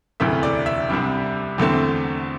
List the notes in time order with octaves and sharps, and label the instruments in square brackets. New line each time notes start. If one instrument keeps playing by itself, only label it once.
[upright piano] E1 D2 C3 E3 A3 E5
D5
E5
C2 C3 G3 D4
E2 D3 A3 C4